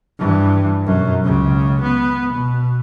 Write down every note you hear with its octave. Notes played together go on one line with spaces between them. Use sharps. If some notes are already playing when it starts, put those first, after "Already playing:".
G2 E3
B1 F#2
C#2 C#3
B3
B2